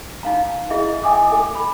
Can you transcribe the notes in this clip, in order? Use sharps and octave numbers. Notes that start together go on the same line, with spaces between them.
D#4 F5 A#5
E4 G#4 D#5 E5
D#5 E5 G5 G#5 D6 D#6
A4 D6
B5